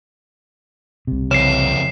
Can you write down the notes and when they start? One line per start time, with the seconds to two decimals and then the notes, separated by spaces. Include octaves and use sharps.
1.07 C2 C3
1.31 F2 C#3 E3 C7 E7